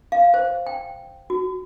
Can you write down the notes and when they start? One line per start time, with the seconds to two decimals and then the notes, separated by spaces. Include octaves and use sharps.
0.12 F5
0.34 C5
0.66 G5
1.30 F#4